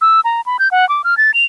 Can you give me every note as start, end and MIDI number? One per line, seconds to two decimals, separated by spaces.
0.01 0.20 88
0.25 0.41 82
0.46 0.57 83
0.59 0.71 91
0.71 0.88 78
0.89 1.02 86
1.04 1.17 89
1.17 1.31 93
1.34 1.45 101